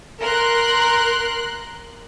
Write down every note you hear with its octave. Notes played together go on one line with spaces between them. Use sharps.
A#4 C6 F#6